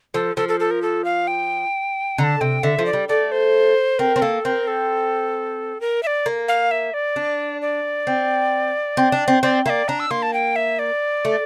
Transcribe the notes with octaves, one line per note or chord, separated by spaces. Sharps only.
F3 A4
F3 A4
A4
A4
A#4
A4
F5
G5
D3 A#5
A5
C3 G5
D3 E5
F3
D5
G3
A3 D5
C5
C4 A#4
C4
A#3 A4
C4 A#4
A4
A#4
E5
D5
A#3
F5
E5
D5
D4
D5
C4
C4
D4
C4
C4 D5
A#3 D5 E5
D4 A#5
E6
A#3 C6
A5
G5
E5
D5
A3